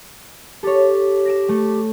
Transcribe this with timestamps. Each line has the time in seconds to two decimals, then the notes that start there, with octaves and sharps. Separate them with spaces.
0.63 G4 A4 C#5
1.25 A#6 D7 E7
1.49 A3